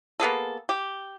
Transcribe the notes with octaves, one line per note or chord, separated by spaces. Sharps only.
A#3 B3 G#4 A4
G4